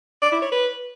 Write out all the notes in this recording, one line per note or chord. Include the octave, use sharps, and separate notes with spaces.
D5
E4
C#5
B4